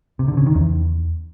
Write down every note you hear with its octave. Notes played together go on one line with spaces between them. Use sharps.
C3
D3
C#3
D#3
E2